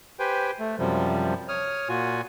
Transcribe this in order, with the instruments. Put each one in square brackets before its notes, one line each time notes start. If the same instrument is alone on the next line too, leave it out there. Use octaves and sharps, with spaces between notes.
[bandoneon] G4 B4 C5 G5 G#5
A3
F#2 C3 F3 G3
C#5 D#6 F6
A#2 F4 F#4 G#5